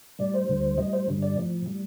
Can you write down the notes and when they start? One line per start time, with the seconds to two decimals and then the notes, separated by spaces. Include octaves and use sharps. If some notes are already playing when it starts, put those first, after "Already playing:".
0.19 A2 G3 D5
0.34 C5
0.48 D2 D3 G3
0.78 A2 G3 D#5
0.93 C5
1.08 G2 D3 G3
1.22 D5
1.37 A2 F3
1.66 A2 G3